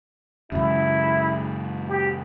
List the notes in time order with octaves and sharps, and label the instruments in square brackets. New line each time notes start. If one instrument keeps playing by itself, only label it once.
[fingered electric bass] C#2 F#2 [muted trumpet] E4
[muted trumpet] G4